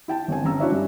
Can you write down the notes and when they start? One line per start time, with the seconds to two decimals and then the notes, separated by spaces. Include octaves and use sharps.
0.08 E4 G5 A5
0.28 G1 C4 G#5
0.44 G1 C#4 A#5 E6
0.60 D4 E4 F#4 C#5 D5 E5
0.72 G2